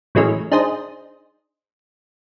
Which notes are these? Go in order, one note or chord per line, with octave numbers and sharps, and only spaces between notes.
A2 E3 F#3 G#3 A3 C#4
D4 D#4 G#4 C5 D#5